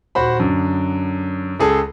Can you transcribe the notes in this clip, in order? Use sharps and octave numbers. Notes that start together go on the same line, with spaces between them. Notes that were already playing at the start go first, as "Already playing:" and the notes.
D#1 F#4 C5 B5
F#2 D3
C#2 G#4 A4